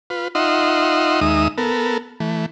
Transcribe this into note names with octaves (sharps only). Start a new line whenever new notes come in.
F4 B4
D#4 F4 D#5 E5 F#5 C6
D#2 G#3 D#4 E5 D#6
B3 A4 A#4
E3 A3